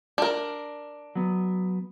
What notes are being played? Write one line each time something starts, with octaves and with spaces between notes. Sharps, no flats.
D4 A#4
F#3 B3